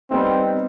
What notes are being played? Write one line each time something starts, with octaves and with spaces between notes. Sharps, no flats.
G3 B3 C4 D#4